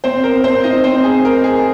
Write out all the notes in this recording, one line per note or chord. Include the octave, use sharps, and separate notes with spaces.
C4 C5
A#4
C4 C5
D#4 D#5
C4 C5
G#4
A#4
G#4